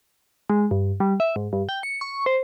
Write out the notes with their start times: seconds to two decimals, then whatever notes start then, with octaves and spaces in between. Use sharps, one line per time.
0.50 G#3
0.71 G2
1.00 G3
1.20 E5
1.36 G#2
1.53 G2
1.69 G5
1.83 C#7
2.01 C#6
2.26 C5